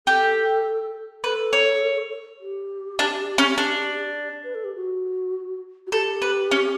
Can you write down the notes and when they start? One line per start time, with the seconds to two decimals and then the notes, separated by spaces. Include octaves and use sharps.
0.07 G4 A4
1.24 A4 B4
1.53 C#5
2.41 G4
2.99 D4
3.38 C#4
3.58 D4
4.44 B4
4.55 A4
4.64 G4
4.75 F#4
5.87 F#4
5.92 G4 A4
6.22 B4
6.51 C#4